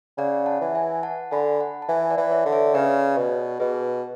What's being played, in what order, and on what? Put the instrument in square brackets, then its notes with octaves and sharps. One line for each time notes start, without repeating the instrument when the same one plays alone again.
[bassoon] C#3 [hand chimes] D5 F#5
[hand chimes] F#5 A5
[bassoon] E3
[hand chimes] E5 G#5
F#5 A5
[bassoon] D3 [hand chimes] G#5 B5
[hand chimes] B5
F#5 A5
A5
[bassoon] E3 [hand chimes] E5 G#5
[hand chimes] D5 F#5
[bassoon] E3
[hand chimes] C#5 E5
[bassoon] D3
[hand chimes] C#5 E5
[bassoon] C#3 [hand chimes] B4 D5
[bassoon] B2
[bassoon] B2 [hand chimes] G#4 B4